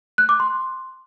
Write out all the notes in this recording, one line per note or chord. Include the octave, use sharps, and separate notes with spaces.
F#6
D6
C6